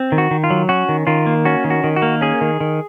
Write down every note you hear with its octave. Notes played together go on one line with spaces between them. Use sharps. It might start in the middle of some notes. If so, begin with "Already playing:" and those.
Already playing: C4
D#3
F#4
D#3
F4
F#3
C#4 F#4
D#3
D#3 F4
A#3
C#4 F#4
D#3
F#4
D#3
F#4
A#3
C#4 G#4
D#3
D#3